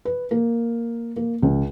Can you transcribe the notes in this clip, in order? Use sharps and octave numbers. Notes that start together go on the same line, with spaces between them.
B4
A#3
A#3
C#2